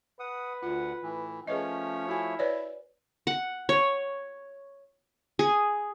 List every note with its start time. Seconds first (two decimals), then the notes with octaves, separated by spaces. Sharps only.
0.20 B4 F#5 D#6
0.63 D2 F4 F#5
1.02 A2 E3
1.47 F3 A3 C#4 G#4 B4 C#5 D#5
2.09 E4 F#4 G#5
2.39 B4 C#5 D5
3.27 F#5
3.69 C#5
5.39 G#4